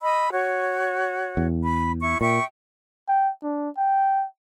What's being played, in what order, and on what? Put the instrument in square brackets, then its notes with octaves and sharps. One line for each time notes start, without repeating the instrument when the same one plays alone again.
[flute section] D#5 B5 E6
F#4 C#5
[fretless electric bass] E2
[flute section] B5
E4 C#6
[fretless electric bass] A#2 [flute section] E5 G5 C#6
[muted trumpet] G5
D4
G5